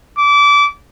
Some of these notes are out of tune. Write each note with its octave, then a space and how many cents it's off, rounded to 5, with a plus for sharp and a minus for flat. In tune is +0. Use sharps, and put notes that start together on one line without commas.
D6 -25